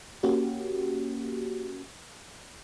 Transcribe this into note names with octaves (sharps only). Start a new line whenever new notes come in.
A#3 C#4 F#4 G4